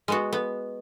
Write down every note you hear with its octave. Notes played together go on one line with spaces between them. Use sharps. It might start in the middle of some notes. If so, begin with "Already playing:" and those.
G#3 B3 F#4
B3